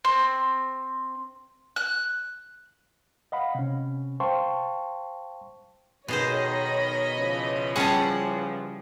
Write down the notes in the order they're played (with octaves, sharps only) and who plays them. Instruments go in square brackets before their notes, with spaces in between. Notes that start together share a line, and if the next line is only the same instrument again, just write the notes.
[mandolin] C4
F#6
[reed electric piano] D#5 F5 F#5 B5
C3 C#4
C5 F5 G5 A5 C6 C#6
[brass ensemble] B1 D#3 [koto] B2 G#4 C5 [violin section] C#5 D#5 B5
[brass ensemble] C#3 E3 F3
[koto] G3 C#4 F#5 [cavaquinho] G#4 A5